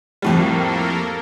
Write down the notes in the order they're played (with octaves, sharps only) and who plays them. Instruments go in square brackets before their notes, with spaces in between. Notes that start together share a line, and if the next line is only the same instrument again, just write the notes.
[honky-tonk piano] F2 A2 G3 [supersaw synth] A#3 A4 A#4